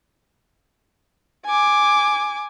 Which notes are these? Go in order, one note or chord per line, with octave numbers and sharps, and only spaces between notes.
G#5 D6